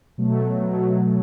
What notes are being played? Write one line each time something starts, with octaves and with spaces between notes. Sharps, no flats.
B2 F#3 A3
B2 F#3 A3
B2 F#3 A3